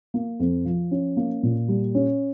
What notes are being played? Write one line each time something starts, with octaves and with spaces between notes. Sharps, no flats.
A#3
F2
F3
C#4
A#3
A#2
G3
C#4